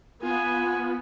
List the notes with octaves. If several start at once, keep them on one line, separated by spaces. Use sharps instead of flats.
B3 F4 G#5